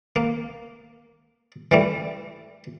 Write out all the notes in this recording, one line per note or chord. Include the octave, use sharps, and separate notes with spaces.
A#3
E3 G3 A3